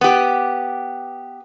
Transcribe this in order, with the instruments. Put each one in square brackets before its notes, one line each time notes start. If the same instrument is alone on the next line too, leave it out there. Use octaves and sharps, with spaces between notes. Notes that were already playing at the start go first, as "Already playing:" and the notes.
[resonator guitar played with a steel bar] B3 G4